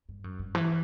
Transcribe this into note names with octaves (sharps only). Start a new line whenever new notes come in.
G2
F#2
G2
E3